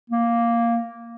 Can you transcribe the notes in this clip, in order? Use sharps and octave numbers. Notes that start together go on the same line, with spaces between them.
A#3